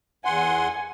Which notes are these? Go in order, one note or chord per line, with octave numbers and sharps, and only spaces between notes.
E2 F#5 G#5 C6